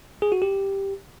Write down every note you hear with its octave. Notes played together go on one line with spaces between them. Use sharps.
G#4
F#4
G4